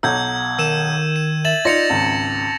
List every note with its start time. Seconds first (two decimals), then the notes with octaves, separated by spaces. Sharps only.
0.03 B1 F#5 A#5 E6 G6 G#6
0.58 D#3 E6 D#7 E7
1.16 E7
1.45 E5 A6 E7 F#7
1.65 D#4 F4 D5 A#6 C#7 F7
1.90 G#1 C#2 A5